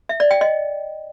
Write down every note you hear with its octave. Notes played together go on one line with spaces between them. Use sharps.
E5
D5
G5
D#5